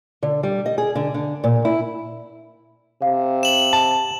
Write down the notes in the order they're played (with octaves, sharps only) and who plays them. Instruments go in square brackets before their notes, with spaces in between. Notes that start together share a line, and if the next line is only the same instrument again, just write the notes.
[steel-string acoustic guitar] D3
G3
D#5
G#4
D3
D3
A#2
E4
[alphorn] C3 [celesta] F5
[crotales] E7 F#7
[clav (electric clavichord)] A5